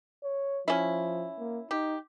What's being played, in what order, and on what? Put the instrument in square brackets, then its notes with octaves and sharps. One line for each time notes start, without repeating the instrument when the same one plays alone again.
[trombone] C#5
[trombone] F3 [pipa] C#4 E4
[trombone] A#3
[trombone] D#4 [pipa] G4